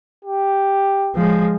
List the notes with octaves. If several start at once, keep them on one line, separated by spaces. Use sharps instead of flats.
G4
F3 G#3